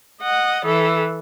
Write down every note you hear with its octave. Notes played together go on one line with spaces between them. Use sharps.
D#5 F#5
E3 A4